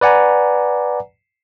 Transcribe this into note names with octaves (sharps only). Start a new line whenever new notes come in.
B4 D5 F#5 G#5 A#5